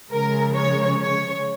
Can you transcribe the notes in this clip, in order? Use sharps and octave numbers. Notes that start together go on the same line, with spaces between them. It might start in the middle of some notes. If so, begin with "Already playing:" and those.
C#3 F3 G#3 A#4
C#5
C#5